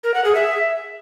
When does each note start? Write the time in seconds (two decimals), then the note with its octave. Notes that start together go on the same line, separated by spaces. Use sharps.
0.04 A#4
0.14 F#5
0.25 G#4
0.35 E5